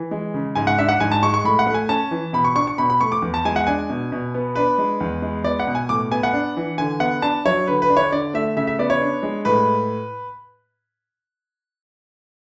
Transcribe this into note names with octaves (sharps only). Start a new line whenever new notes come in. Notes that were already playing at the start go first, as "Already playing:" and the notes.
Already playing: E3
G#3
C#3
G#2 G#5
F#5
D4 E5
F#5
G#2 G#5
A5
G#3 C#6
C#6
A2 B5
F#5
A3
G#5
C#4 A5
E3
B2 B5
C#6
D4 C#6
C#6
B2 B5
B5
A3 C#6
D6
E2
A5
G#3 G#5
F#5
D4 G#5
B2
B2
B3
D4 B4
G#3
E2
G#3
B3 D5
F#5
B2
G#5
A2 D6
B3 G#5
F#5
D4
E3
D3 G#5
B3 F#5
D4 A5
F#3 C#5
D3 B4
B4
D4
C#5
D3 D5
A3 E5
C#3 E5
E5
B3 D5
C#5
D4
G#3
A2 B4